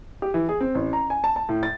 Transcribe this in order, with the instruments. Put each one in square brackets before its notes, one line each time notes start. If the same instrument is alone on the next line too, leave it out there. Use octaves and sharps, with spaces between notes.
[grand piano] G4
E3
G#4
C4
A1
A#5
G#5
A5
A5
A2
A6